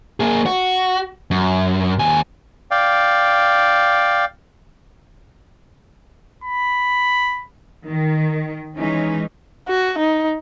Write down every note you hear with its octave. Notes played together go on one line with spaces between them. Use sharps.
A#3 G#4
F#4
F#2
D#2 G#5
D5 F5 G5
B5
D#3
E3 G#3 C#4 D#4
F#4
D#4